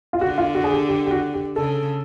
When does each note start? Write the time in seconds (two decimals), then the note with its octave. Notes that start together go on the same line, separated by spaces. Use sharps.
0.13 F4
0.21 D3 F#4
0.38 F4
0.55 F#4
0.64 G#4
0.72 G4
0.89 G4
1.06 G4
1.11 F#4
1.34 G4
1.56 C#3 A4